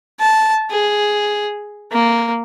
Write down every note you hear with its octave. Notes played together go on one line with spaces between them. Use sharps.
A5
G#4
A#3